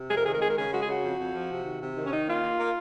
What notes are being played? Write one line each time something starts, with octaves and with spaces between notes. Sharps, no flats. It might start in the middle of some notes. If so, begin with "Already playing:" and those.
Already playing: C3
F2 G#4
A#4
D#3 G#4
A#4
G#3 G#4
A#4
C#3 G#4
G#3 F#4
G#4
C#3 F#4
F2
F2
F3
C3
D#3
C3
D#3
C#4
D#3 D#4
A#3 F4
A#3
A#3